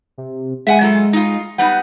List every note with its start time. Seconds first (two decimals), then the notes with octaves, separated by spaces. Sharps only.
0.18 C3
0.67 G#3 E5 F#5 G#5
0.81 F#3 F4 A4
1.13 D#4 F4
1.58 G3 B3 D#4 F#5